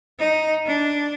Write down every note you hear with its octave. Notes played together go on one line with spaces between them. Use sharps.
D#4
D4